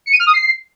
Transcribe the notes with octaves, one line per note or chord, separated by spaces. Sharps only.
C#7
D#7
F6
D#6
C7